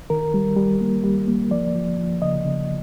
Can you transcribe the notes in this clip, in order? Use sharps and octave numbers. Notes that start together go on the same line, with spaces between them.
D#3 A#4
G3
G3
A#3
G3
A#3
F3 D5
F3
F3
C#3 D#5
C#3